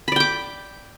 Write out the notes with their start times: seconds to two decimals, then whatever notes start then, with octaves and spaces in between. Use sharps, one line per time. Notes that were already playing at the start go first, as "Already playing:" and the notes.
0.08 B5
0.12 D5
0.16 G5
0.20 D6